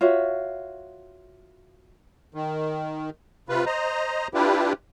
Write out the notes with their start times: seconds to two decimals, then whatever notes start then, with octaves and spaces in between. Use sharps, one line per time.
0.01 F4 F#4 C#5 E5
2.34 D#3
3.49 C3 F4 B4
3.66 C5 D#5 A#5
4.34 D4 E4 F4 G4 B4